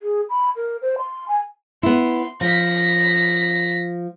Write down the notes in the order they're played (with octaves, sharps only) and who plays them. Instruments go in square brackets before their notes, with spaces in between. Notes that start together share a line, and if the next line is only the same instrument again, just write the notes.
[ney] G#4
B5
A#4
C5
C6
G#5
[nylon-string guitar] B3 E4 [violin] C6
[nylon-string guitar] F3 [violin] A#6 B6